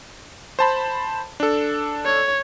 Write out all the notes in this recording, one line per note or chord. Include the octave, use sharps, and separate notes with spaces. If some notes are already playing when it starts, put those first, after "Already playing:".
C5 A5 B5
D4 A4
C#5